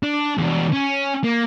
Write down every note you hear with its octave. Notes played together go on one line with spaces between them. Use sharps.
D4
E2 D4
C#4
A#3